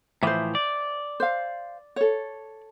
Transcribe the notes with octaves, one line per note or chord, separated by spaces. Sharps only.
A2 E3 F3 C5 E5
D5
C5 F5
A4 C#5